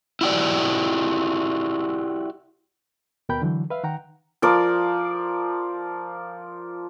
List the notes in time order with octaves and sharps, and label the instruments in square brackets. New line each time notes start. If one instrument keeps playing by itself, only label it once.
[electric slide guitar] E4 F#4 G4 D5
[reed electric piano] D#2 B2 A#4 G5 B5 G6
D3 E3 F#3
B4 E5 F5
D#3 F#5 G5 A#5
[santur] F3 A#4 D5